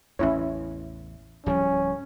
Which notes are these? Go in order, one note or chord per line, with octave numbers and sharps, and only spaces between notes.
A1 E2 C#4 E4 C#5
D1 F3 G3 C#4